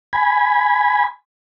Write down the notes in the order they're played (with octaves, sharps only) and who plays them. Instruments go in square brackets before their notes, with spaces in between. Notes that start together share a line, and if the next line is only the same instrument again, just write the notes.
[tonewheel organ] G#5 B5